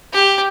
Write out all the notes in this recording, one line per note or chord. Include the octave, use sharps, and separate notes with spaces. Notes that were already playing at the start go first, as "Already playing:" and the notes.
G4